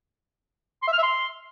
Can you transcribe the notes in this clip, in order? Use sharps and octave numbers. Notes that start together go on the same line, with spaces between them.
C6
E5
F6
E5
C6